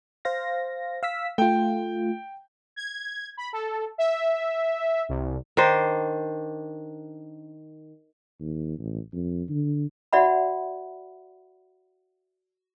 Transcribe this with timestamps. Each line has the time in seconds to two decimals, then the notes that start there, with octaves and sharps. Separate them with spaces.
0.25 C5 F5 A#6
1.03 F5 E6 B6
1.38 A3 F4 G5
2.76 G#6
3.37 B5
3.53 A4
3.98 E5
5.09 C2
5.57 D#3 D4 C5
8.40 D#2
8.79 A1
9.13 F2
9.49 D3
10.13 F#4 D5 E5 F#5 B5